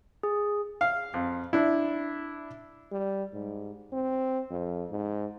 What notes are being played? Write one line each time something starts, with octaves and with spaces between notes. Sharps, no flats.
G#4
F5
F2
D4 E4
G3
G#2
C4
F2
G#2